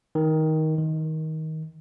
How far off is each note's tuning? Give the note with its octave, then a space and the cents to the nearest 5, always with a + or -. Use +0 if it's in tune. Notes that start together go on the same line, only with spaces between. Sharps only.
D#3 +15
D#3 +20